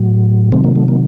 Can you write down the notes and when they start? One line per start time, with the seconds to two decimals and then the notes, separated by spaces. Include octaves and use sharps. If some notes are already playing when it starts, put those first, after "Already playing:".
Already playing: A2 F#3
0.52 C3 D#3 F#3 A3 C4
0.64 A#3
0.76 A3
0.88 A#3